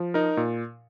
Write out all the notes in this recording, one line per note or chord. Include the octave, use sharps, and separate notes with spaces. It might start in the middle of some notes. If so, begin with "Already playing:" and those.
Already playing: F3
D#4 A#4
A#2